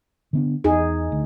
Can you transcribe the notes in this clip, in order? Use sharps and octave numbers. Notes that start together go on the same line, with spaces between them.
D3 B3 D4
E2 D#4 G#4
D2